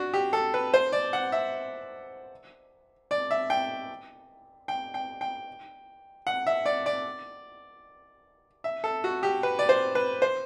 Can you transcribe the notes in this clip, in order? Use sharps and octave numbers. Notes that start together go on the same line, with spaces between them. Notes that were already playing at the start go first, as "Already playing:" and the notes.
Already playing: D4 F#4
G4
A4
B4
C5
D5
F#5
E5
D5
E5
G5
G5
G5
G5
F#5
E5
D5
D5
E5
A4
F#4
G4
B4
D5
C5
B4
C5